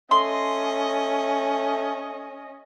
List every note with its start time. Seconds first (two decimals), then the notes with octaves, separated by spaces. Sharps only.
0.11 A3 C#4 D#5 C6